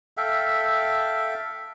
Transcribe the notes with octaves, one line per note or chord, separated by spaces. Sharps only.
A4 E5 F5 G5